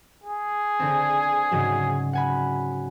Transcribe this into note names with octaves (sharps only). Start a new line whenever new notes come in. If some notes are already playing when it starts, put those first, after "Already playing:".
G#4
D3 C4
G#2 C#3 F#3
F#5 G#5 B5